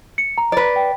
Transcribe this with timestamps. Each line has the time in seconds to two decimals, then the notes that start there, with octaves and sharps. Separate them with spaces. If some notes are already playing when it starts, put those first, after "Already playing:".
0.18 C#7
0.38 A#5
0.52 B4 D5
0.76 G5